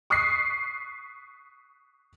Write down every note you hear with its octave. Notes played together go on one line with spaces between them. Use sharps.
C#6 D#6 F#6 B6 C7